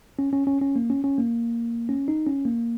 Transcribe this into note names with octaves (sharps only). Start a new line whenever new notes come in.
C#4
C#4
C#4
C#4
A#3
C#4
C#4
A#3
C#4
D#4
C#4
A#3